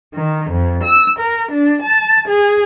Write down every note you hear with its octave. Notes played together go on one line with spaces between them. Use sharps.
D#3
F2
E6
A#4
D4
A5
G#4